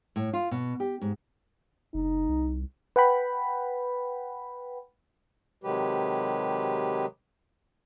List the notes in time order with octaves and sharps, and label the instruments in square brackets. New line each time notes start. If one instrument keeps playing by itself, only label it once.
[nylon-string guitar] A2
F4
B2
G4
G#2
[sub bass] F#1 [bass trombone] D#4
[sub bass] C2
[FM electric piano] B4 F#5 G5 B5
[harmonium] C3 D#3 F#3 G#3 G4 B4